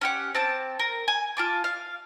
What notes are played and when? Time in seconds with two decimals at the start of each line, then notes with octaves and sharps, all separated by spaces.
0.01 C#4 G4 F#5
0.35 C4 A5 D6
0.79 A#4
1.08 G#5
1.37 F4 A5 D6
1.64 F5